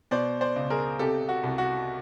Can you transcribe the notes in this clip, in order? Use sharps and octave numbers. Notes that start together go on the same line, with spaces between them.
B2 C5 D5
C5 D5
C#2
G#4 A#4
C3 G4 A4
F#4
C2
F#4